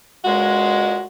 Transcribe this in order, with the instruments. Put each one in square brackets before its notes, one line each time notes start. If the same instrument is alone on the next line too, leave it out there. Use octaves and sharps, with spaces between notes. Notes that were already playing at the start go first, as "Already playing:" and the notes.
[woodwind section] C#2 A#2 G#3 [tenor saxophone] F#4